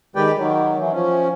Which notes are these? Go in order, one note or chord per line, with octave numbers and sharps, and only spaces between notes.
D#3 G#3 G4 B4 D5 G5
D#3 F#3
E3 F#3
F3 C#4